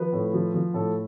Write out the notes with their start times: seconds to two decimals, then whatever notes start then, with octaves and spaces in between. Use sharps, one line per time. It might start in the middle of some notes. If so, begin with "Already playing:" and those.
Already playing: F3 B4
0.12 A2
0.33 F3
0.54 F3
0.74 A2 A4